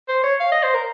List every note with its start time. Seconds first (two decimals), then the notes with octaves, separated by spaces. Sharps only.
0.08 C5
0.24 C#5
0.40 F5
0.52 D#5
0.63 C5
0.74 A#4